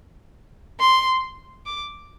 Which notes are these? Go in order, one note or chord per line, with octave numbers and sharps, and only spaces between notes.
C6
D6